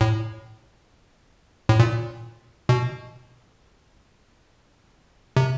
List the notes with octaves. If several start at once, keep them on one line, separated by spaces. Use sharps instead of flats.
A2
A2
A#2
B2
C3